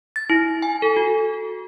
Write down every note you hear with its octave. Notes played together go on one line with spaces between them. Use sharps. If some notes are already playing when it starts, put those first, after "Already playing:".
A6
E4
G#5
A4
F#4